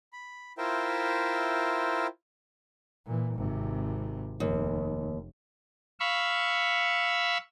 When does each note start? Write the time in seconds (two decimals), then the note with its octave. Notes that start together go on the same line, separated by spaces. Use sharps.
0.13 B5
0.58 E4 F4 A#4 C5 E5 G5
3.06 A#2 E3
3.35 G#1 C3
4.40 F1 D#2
6.00 F5 B5 C#6 E6